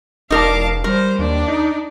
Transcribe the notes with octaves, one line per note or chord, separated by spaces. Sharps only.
E1 D#4 A#4 D5 F5 A5 D6
G3 A#4 C5
D#2 D4
D#4